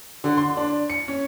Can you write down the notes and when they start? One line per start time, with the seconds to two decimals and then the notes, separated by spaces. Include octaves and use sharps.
0.24 D3
0.37 C6
0.57 D4
0.90 C#7
1.08 C#4